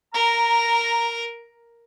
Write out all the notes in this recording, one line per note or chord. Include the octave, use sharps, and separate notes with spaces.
A#4 A#5